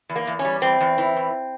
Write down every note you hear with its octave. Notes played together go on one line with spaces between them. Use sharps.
E2
A#3
E2
C#4
G3
E2 C4
E2
E3
E2